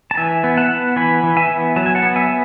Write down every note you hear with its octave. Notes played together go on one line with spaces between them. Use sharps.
A5
E3 E5 G#5
B3
F#5 A5
B3
E3 G#5 B5
E3
E5 G#5
B3
F#3 A5
G#5
F#5 A5
B3
E5 G#5
B3